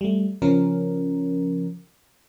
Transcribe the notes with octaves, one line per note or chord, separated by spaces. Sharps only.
G3 A3
C#3 F3 C#4 A#4